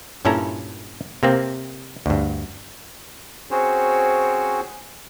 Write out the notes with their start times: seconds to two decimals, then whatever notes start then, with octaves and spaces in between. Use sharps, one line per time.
0.25 G2 A#2 C#4 E4 A4 A#5
1.23 C3 A#3 C4
2.06 D2 G2
3.51 C4 C#4 F#4 G#4 C5 C#5